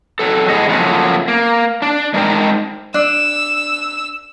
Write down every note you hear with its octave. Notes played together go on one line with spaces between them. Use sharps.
F#3 A4
A2 G#4 D#5 F#5
C#3 F3 F#3 A3 A#3 F#4
A#3
D4
G#3 D4 D#4 A#4 C5 G5
D4 E6